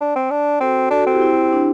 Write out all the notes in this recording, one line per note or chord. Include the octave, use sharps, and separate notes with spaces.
D4
C4
D4
C4 F#4 A4
D4 F#4 A4
F#4 A4
C4
E4 G4
E4
D4